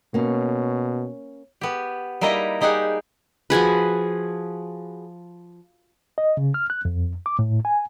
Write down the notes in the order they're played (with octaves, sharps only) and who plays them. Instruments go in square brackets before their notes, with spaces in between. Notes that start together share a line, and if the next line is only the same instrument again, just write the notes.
[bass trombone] B2 [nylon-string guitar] A#3 C#4
[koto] B3 G4
G3 A#3 D#4 E4 D#5 A#5
G3 D#4 G4 G#4 F#5
[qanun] F3 F#4 G#4 B4
[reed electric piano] D#5
C#3
F6
F#6
F2
D6
A2
G#5